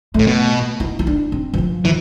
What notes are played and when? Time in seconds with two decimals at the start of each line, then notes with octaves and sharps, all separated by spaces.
0.14 A2 A3
0.27 B2
0.80 E4
0.99 E4
1.07 D4
1.32 C4
1.54 E3
1.58 F3
1.85 E3 F3